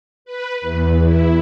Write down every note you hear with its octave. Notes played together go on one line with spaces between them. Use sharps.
B4
E2
E4